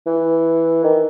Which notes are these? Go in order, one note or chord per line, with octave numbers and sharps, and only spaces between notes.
E3
D#3